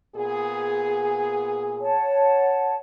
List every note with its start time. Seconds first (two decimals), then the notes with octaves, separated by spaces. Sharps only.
0.15 A#2 B3 G#4
1.81 C#5 F#5 A5